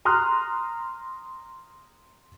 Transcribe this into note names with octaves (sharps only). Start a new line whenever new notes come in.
A#5 C6 D#6 F6 F#6